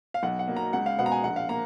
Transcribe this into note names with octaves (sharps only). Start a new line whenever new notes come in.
F5
B1 F#5
F#5
B2 F#3 A#3
A#5
C#2 F#5
F5
B2 G#3 B3 F#5
A#5
G#5
A#1 F#5
F5
A#3 A#5